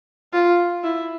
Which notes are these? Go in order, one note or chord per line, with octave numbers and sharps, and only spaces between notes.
F4
E4